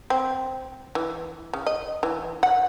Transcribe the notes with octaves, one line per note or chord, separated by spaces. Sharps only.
C4
E3
C#3
D#5
E3
F#5